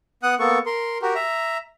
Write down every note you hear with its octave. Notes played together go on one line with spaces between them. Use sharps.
B3 F#5 D#6 F#6
A#3 B3 A4 C#6
A#4 C6
F#4 G4 A#4
E5 A#5